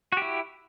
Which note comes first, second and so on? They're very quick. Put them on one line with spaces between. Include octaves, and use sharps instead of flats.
F#4 G4 E4